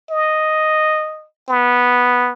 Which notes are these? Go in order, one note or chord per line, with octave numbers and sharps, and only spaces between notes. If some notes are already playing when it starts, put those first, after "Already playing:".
D#5
B3